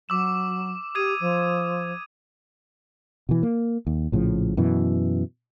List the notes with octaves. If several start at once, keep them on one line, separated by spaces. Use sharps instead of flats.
F#3 D6 E6 E7
G4 D#6 G#6 D#7
F3
B2 E3
A#3
D#2
A#1 A2 C#3 F3
F#2 B2 E3